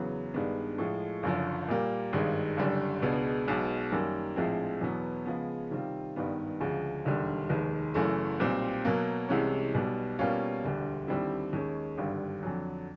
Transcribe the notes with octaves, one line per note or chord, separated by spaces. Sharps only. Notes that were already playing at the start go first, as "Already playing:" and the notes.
Already playing: E2 C#3 F#3 B3
G2 D#3 G#3 B3 D4
A2 F3 G#3
F#1 F#2 D3 F3
A#2 G3 A#3
G#1 G2 D#3 G#3
F#1 F#2 D3 G3
C#2 B2 G#3 B3 D4
B1 B2 G#3 B3
F#2 D#3 G3 A#3
A#1 A2 F3 G#3 C4
E2 B2 F#3 B3
C#3 F3 G#3 B3
C3 D#3 G3 C4 F4
G#1 G2 D#3 G3 B3
D2 C#3 F3 G#3
E1 D#2 D3 G3
F1 D#2 D#3 G#3
F#1 F#2 C#3 E3 A3
B1 A#2 G3 C4
B2 F#3 A#3
C2 C3 E3 G#3 C#4
B1 B2 G3
B2 G3 A#3 C#4 F4
E1 D2 D3 G3
D#2 D3 G3 C4 E4
D#2 D#3 G#3 C#4
G#1 G2 D3 G3
F2 D3 F#3